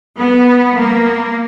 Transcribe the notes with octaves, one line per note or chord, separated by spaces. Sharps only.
B3
A#3